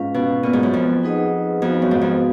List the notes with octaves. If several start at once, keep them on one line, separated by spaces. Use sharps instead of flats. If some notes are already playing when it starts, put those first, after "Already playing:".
Already playing: G#2 C#4 F4 B4 F5
B2
A#2 B3 F4 B4
G#2
F#2
F2
D#4 G#4 B4 D#5 F#5
F2 B3 F#4 B4 F5
F#2
G#2
F2